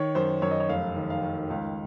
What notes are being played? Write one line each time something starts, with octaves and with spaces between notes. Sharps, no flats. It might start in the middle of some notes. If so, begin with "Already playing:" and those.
Already playing: D#3 C#5
F#2 C5
F#2 C#5
D#5
C#5
F1 F5
D#3
F5
D#3
C#2 F5